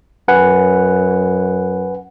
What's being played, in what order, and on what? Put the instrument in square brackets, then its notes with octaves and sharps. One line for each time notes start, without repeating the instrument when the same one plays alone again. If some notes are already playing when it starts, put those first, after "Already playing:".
[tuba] F#2 [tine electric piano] B4 F#5 G#5